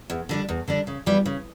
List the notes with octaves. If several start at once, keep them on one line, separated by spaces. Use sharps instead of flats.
E2
D3 G3 D4
E2
D3 G3 D4
C#3
E3 G3 B3
C#3